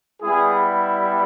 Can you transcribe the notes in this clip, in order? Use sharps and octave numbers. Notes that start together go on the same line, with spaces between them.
G3 B3 E4 G#4